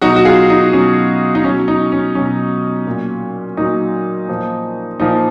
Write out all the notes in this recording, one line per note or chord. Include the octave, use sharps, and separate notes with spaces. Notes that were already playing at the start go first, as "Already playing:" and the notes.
B2 F#3 D#4 F#4
F#4
F4 G#4
D#4
B2 F#3 C#4
D#4
B2 F#3 C#4
D#4
C#4
B2 F#3 C#4
A#2 F#3
A#2 F#3 D#4
A#2 F3
A#2 F3 D#4